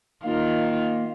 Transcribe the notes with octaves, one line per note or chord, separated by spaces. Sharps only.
D#3 A#3 F4